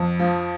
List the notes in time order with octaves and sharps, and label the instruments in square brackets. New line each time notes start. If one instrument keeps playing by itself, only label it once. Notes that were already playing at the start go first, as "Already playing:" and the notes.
Already playing: [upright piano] F2
F3